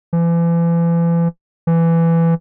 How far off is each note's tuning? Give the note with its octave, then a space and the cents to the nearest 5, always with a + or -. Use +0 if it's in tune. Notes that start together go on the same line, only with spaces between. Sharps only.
E3 +40
E3 +15